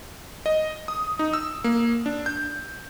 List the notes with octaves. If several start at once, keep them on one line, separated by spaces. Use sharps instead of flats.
D#5
D#6
D#4
E6
A#3
D4
G6